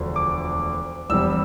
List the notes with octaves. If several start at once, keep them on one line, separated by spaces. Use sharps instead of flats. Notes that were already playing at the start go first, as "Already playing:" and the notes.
Already playing: E1 D2 F3
D6
F1 E2 C3 G3 E6